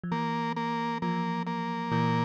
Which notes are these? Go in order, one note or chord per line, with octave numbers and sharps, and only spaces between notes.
F3
E3 A#3
A#3
F3 A#3
A#3
A#2 E3